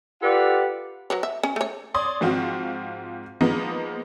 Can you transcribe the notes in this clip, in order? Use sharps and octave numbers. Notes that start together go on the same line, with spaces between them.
F4 G4 A4 B4 D5 F#5
F#3 B4 C#5
E5
C#4
A3 C#5
C#5 D5 C6 D#6
G#2 F3 C4 F4 F#4
F3 G#3 A#3 B3 D#4